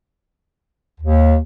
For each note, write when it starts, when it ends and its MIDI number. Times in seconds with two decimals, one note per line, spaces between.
1.01 1.36 39